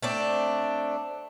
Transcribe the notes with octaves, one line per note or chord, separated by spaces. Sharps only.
A3 C4 D4